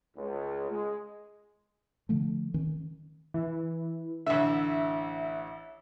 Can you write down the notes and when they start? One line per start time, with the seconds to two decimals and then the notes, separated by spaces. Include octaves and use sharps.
0.17 C#2
0.70 G#3
2.09 D3 F3 A3
2.54 D#3 C#4
3.34 E3
4.26 A1 D3 E5